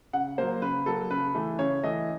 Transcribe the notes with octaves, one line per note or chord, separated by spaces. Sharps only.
C#3 F#5
F#3 A#3 C5
C#3 B4
F#3 A#3 A4
C#3 B4
E3 A3
C#3 C#5
E3 A3 D#5